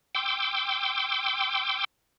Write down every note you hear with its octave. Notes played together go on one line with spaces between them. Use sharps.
G5 C6 D6 E6